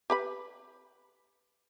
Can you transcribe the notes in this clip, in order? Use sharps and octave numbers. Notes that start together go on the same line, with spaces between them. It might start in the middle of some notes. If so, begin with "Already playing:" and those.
G4 B4 B5